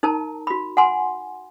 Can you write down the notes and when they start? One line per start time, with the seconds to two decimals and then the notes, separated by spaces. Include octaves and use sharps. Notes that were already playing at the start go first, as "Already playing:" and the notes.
0.03 D#4 A#4 A5 A#5
0.47 F#4 B5
0.77 F#5 G#5 C6